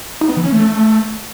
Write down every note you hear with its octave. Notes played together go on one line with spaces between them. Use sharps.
D#4
B3
E3
C#4
A3